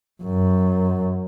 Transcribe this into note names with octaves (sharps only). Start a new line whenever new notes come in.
F#2